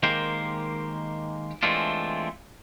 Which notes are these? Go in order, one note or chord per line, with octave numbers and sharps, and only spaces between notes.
D#3 G#3 A#3 G4 A#4 C5
E3 G#3 A3 C4 D4 F4